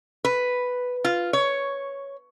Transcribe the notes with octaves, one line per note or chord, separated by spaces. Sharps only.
B4
F4
C#5